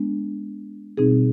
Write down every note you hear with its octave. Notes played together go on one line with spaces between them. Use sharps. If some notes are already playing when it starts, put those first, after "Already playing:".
Already playing: G#3 B3 D4
B2 G3 C4 D#4 G#4